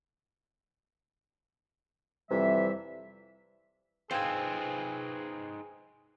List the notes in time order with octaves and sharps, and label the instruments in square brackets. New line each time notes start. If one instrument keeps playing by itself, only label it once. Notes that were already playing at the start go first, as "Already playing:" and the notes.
[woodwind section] F2 C3 E3 G3 E5
[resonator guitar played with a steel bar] C4 [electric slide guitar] D#4 B4 C5 [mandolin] F4 G#5 [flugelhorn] G#4